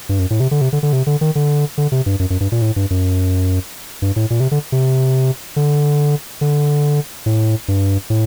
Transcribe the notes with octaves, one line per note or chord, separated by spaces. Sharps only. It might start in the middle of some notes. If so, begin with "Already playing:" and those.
G2
F#2
A2
C3
D3
C3
D3
D3
C3
D3
D#3
D3
D3
C3
G2
F#2
F#2
G2
A#2
A2
G2
F#2
G2
A2
A#2
C3
D3
C3
D3
D3
A2
G2
A2